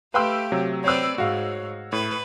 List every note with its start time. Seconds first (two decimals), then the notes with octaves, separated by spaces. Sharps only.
0.14 A3 G4 B4 F5 G5 B5 C6 E6
0.52 C3 F#3
0.84 C4 B4 C#5 D5 E6
1.18 G#2 F#4 F5
1.92 A2 B4